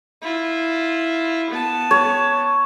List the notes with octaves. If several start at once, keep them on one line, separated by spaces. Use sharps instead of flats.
E4 F4
B3 A5
C#5